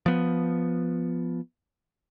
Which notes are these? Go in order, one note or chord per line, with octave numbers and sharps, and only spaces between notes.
F3 B3